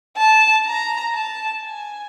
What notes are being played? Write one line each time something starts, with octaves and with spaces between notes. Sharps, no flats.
A5
A#5
A5
G#5